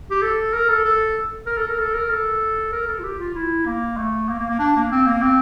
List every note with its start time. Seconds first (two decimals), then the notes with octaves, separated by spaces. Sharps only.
0.11 G4
0.22 A4
0.53 A#4
0.69 A4
0.85 A4
1.47 A#4
1.57 A4
1.68 A#4
1.79 A4
1.94 A#4
2.10 A4
2.73 A#4
2.87 A4
2.99 F4
3.04 G4
3.19 F4
3.35 E4
3.66 A#3
3.97 A3
4.29 A#3
4.39 A#3
4.50 A#3
4.59 D4
4.76 A#3
4.92 C4
5.06 A#3
5.22 C4